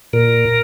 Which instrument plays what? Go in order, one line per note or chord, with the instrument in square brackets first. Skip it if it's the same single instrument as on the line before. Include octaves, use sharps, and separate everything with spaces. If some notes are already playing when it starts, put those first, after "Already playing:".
[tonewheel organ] A#2 A#4